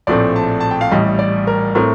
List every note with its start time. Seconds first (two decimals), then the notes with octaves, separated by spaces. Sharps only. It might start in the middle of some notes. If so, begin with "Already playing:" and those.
0.07 A#1 A2 A3 C4 D5
0.36 A5
0.61 A5
0.71 G5
0.81 F5
0.91 A1 A2 G3 D#5
1.19 D5
1.47 A#4
1.75 A2 A3 C4 A#4